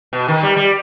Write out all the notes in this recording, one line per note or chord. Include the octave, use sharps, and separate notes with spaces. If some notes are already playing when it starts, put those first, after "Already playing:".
B2
D#3
G3
G3